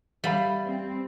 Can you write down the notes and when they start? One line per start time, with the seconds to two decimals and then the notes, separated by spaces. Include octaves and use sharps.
0.24 G3 E5 F5 B5
0.65 C4